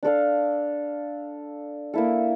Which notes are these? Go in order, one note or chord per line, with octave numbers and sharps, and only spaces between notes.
D4 A4 D5 F5
A#3 E4 A4